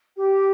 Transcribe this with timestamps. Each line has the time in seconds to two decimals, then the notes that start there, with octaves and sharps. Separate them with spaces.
0.17 G4